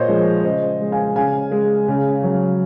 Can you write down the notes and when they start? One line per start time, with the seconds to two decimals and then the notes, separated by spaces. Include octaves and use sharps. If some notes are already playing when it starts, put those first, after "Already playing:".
Already playing: A#2 C5 C#5 D#5
0.08 F3 G#3
0.44 C#3 C5 D#5
0.80 G#3
0.92 F5 G#5
1.16 C#3 F5 G#5
1.51 G#3
1.88 C#3
2.23 F#3